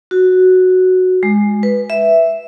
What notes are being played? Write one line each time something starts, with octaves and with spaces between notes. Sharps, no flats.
F#4
G#3
B4
E5